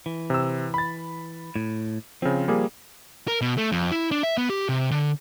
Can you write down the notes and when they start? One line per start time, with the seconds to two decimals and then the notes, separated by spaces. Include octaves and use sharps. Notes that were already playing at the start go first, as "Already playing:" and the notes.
0.06 E3
0.30 C3 E6
0.74 B5 A6
1.56 A2
2.22 C#3 F3 C4
2.48 G3 A#3 G#4
3.28 A#4
3.41 B2
3.58 A3
3.72 F2
3.91 E4
4.11 D4
4.23 E5
4.37 B3
4.49 G4
4.69 C3
4.91 D3